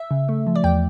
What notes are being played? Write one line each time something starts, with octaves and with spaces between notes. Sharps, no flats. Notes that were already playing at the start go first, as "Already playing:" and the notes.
Already playing: E5
C#3
A3
F3
D5
E2 G5